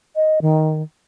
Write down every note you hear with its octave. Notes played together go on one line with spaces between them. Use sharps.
D#5
D#3